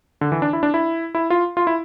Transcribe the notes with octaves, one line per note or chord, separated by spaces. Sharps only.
D3
E3
D4
E4
D4
E4
E4
F4
F4
E4